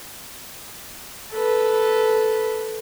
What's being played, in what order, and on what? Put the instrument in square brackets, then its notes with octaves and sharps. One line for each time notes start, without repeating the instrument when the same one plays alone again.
[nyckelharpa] A4 B4